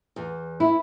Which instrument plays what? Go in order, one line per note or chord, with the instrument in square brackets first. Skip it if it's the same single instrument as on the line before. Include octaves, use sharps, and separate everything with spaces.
[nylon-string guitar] E2
E4